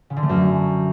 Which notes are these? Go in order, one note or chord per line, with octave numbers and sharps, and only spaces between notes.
C#3
D3
A3
F#2